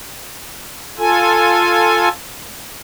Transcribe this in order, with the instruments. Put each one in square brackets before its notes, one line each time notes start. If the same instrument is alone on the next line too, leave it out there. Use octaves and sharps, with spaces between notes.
[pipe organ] F4 A4 G#5